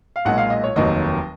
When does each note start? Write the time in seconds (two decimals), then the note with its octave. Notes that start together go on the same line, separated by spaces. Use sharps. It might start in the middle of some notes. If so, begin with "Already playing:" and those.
0.16 F5
0.25 B1 A#2 G#3 F#5
0.38 F5
0.50 D#5
0.64 C#5
0.76 F1 D#2 D#3 F#3 D#5